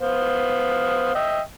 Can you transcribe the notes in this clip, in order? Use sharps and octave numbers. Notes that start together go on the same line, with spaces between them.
B3 C5 F5
D#5 E5 G5